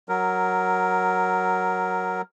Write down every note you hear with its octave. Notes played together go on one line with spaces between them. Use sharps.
F#3 A#4